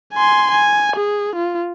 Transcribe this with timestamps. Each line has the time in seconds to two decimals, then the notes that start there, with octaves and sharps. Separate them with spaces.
0.14 G#5 C6
0.51 G#5
0.96 G#4
1.35 F4